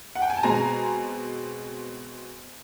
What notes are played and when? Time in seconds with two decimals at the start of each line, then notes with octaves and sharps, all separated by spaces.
0.15 F#5
0.22 G5
0.30 G#5
0.37 A5
0.43 B2 G#3 C4 G#5 A#5